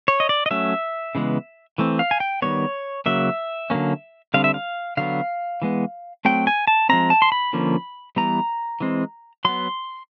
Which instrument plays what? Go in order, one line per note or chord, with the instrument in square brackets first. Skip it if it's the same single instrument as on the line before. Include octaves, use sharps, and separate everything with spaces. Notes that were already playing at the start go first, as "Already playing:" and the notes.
[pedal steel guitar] C#5
D#5
D5
D#5
F#3 A3 C#4 E5
C#3 E3 G#3 B3
E3 A3 C4
F5
G#5
G5
D#3 G3 B3 C#5
C#3 F#3 A#3 E5
D3 F#3 A#3 C#4
D3 G3 C4 F5
E5
F5
D3 F#3 B3 F5
E3 G#3 B3
F#3 A3 C4 G5
G#5
A5
F3 G#3 C4 A#5
A5
C6
B5
D3 F3 A#3 C#4
E3 G3 B3 A#5
E3 G#3 C4
F#3 B3 C6